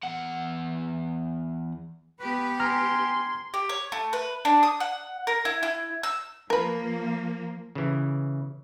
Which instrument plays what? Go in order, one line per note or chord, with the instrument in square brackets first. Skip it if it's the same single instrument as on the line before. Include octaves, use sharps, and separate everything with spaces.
[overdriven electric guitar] E2 F#5
[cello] B3 G4 [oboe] B4
[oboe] G#5 [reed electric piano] A#5 F6 [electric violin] C6
[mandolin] G4
C#5
A3
B4
D4
D#6
F#5
A#4
E4
E4
E6
[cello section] F3 A#3 [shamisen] A#4 B4
[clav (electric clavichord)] C#3 E3